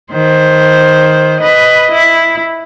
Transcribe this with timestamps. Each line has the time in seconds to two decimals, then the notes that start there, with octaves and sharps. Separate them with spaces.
0.12 D#3 C5
1.41 B4 D#5
1.92 E4